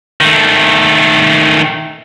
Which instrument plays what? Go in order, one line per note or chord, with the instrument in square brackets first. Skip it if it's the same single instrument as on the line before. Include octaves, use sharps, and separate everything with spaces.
[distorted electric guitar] D#3 A3